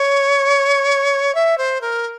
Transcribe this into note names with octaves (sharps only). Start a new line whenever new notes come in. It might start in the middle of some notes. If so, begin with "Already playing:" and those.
Already playing: C#5
E5
C5
A#4